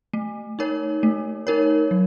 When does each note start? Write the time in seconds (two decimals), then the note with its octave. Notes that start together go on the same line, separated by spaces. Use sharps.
0.14 A3
0.59 D#4 A#4 C#5
1.03 A3
1.47 D#4 A#4 C#5
1.91 F#3